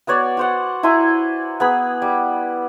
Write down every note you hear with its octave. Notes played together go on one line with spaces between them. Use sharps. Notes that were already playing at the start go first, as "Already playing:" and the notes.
B3 F#4 C#5 D5
F#4 C5 F#5
E4 G#5 A#5 C6
B3 G#4 B5
G3